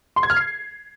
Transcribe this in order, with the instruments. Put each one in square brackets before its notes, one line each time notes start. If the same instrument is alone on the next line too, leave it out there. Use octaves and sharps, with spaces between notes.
[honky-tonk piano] C6
G#6
F6
C7